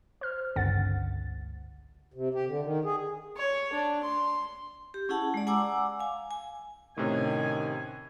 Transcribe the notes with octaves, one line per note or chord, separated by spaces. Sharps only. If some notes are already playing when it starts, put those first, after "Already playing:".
C5 F6
G#1 C#2 G2 D3 F#5 A6
C3
G4
D3
D#3
G#4
C#5
D4
C6
G4
C#4 E4 G#4 F#5 A5
G#3 D5
F#5 G#5 A#5 D6 E6
F5 G#5
G#5
A2 C3 D#3 C#4 G#5